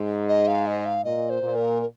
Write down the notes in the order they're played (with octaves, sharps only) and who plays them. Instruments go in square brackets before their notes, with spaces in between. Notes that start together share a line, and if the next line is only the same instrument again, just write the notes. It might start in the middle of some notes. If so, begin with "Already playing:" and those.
Already playing: [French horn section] G#2
[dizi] D#5
F5
D#5
F5
[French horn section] A#2 [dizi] D#5
[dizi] C5
[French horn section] A#2
[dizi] A#4
A#4